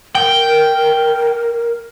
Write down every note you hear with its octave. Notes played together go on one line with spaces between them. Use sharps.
A#4 G5